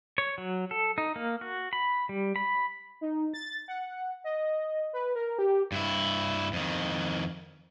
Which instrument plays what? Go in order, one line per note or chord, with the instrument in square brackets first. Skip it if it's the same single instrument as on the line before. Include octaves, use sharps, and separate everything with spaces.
[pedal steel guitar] C#5
F#3
A4
D#4
A#3
F#4
B5
G3
B5
[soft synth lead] D#4
A6
F#5
D#5
B4
A#4
G4
[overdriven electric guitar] G2 E4
F2 D#3